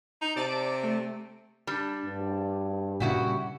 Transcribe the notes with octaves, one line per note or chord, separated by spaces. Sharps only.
D#4
C3 D5 A5 D7
A3
G3 D4
G2
A#2 C#3 G3 E4 F#4 G4